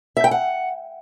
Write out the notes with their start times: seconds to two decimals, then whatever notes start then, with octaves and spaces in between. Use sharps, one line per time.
0.17 E5
0.24 G5
0.31 F#5